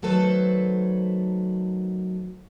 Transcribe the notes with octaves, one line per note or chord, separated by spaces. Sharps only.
D#3 F#3 A3 A4 B4 C5